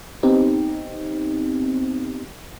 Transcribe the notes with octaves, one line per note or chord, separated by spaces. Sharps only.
B3 C4 D#4 G4